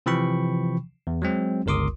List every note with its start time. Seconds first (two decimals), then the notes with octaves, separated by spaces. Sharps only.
0.06 C3 E3 F3 G5 B5 C#6
1.07 E2
1.22 F#3 G#3 C4
1.66 G1 C#2 A#4 C6 D6 D#6